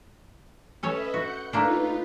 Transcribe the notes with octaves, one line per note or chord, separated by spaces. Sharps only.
C#4 A4 B4 C#5 D#5 E5
F#4 F#5 G6 C#7
A3 A#3 D4 D#4 F4 B4